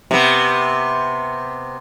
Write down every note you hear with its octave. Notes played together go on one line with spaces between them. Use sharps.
C3 B3